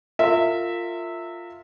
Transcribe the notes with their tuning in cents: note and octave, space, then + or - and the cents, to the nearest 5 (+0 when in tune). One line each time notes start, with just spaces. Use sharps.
F4 +0 A#4 -35 E5 -10